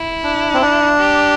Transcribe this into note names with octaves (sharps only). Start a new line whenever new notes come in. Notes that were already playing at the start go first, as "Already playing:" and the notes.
Already playing: E4
D4
C4
D4
G4